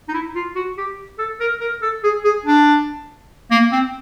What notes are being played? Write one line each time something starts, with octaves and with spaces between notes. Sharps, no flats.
D#4
E4
F4
F#4
G4
A4
A#4
A#4
A4
G#4
G#4
D4
A#3
C4